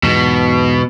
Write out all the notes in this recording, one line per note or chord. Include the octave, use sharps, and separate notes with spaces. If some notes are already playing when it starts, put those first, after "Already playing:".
E2 G#2 B2